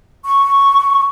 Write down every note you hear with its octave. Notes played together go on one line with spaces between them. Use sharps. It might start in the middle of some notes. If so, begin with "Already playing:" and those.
C#6